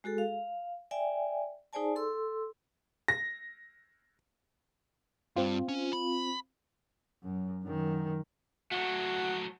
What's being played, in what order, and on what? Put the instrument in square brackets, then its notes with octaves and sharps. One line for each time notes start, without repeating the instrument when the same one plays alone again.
[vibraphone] G#3 F#4 G#4 A4
F5
D5 E5 G5 G#5
D#4 G#4 C5 D5 G#5 A5
A4 C6 E6
[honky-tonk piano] A#6
[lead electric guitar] G2 [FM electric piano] C4 F4
[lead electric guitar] C#4
B5
[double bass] F#2
F#2 D#3
[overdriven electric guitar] F#3 A3 [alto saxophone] F#4